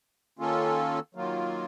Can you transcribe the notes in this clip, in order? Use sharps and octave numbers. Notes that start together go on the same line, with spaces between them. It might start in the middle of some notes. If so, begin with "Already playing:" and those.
D#3 A#3 C#4 F4 A4
D#3 F#3 A#3 F4